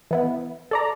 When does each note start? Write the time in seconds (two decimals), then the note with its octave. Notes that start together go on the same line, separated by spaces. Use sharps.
0.11 E3 B3 E4
0.71 A4 D5 A#5